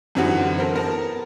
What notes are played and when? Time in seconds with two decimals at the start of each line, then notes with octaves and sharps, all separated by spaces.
0.15 F#2 D3 E3 C4 D#4 F#4
0.58 A4 A#4 C5
0.73 B3 A#4 A5